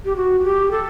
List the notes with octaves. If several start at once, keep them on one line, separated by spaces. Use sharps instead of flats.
G4
F#4
F#4
G4
A4